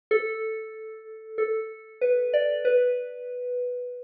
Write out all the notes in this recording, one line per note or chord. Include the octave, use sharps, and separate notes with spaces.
A4
A4
B4
D5
B4